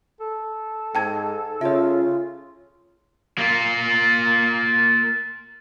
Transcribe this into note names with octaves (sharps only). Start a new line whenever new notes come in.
A4
G#2 G5 A5 G#6
C#3 F4 C#5 E5
A#3 F4